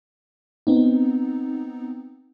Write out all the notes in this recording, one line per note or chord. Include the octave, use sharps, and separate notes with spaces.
B3 C4 D#4